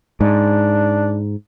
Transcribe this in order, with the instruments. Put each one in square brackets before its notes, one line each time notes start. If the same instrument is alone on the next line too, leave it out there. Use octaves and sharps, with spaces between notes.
[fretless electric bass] G#2 [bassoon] D4